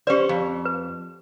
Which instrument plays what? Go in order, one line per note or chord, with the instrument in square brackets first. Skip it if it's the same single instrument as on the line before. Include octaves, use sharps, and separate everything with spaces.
[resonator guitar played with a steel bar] C#4 C5 [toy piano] G4 B4 D5
[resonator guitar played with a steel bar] F2
[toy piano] B4